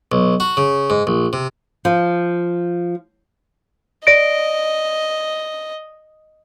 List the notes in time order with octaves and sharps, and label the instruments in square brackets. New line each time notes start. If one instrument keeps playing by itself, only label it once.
[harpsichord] B1
F#4
C#3
G#2
A#1
C3
[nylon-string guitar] F3
[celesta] D5 A#6 D7 [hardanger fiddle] D#5